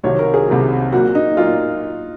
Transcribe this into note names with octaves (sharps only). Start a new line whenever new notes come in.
C2 C3 D#3 F#3 C#5
A#4
G#4
C2 C3 D#3 F#3
A#2 F#3 A#3 F#4
D#4
A#2 F#3 A#3 F4